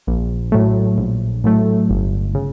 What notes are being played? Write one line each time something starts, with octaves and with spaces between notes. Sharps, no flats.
A#1
A2 F#3 A3
A#1
A2 F#3 A3
G1
C#3